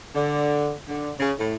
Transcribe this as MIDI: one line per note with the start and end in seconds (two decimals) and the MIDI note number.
0.14 0.72 50
0.88 1.11 50
1.19 1.31 49
1.37 1.56 45